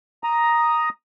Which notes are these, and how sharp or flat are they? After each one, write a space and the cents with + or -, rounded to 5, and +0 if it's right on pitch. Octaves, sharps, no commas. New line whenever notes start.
A#5 +5 D#6 +0